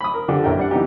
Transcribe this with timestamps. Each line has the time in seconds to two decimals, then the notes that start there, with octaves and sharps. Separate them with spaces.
0.01 B5 D#6
0.14 A#4
0.28 D3 F3 D4 G4 A4
0.44 A#1 F#2 E4 A#4 G5
0.57 G3 D4 F#5
0.71 E3 B3 D#4 G4